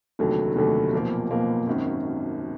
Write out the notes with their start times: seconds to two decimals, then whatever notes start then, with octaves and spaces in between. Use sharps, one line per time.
0.19 F1 D#2 D3 F#3 A3
0.56 F1 D#2 D3 F#3 A3
0.93 B1 A#2 F3 A#3
1.30 B1 A#2 F3 A#3
1.67 G#1 F#2 D#3